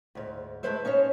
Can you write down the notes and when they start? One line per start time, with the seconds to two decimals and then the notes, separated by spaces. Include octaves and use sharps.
0.15 D2 G#2
0.63 G#3 A3 E4 B4 C5 E5
0.85 C#4 D#4 C5 C#5